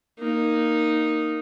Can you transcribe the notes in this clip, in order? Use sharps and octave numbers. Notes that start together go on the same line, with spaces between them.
A#3 D#4